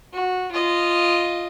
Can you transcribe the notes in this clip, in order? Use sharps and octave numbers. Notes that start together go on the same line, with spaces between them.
F#4
F4 D#5